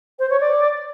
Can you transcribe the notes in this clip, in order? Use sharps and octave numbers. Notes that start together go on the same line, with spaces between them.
C5
C#5
D5